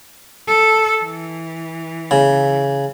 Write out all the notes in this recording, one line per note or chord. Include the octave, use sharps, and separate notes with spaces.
A4
E3
C#3